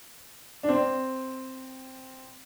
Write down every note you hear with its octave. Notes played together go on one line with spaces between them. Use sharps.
D4
C4